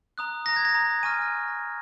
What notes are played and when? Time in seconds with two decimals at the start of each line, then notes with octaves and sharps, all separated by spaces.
0.18 A#5 D#6 F#6
0.46 A#5 D#6 F#6 A#6
0.56 G#6
0.65 A#6
0.75 A#5 D#6 F#6
1.03 G#5 C#6 F6 D#7